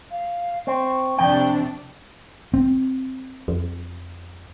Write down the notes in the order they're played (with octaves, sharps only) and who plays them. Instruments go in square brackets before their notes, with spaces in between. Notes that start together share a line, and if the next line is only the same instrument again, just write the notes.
[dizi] F5
[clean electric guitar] C4 [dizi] C#6
[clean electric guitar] F2 G5 [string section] C3 D4
[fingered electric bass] C4
[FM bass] F2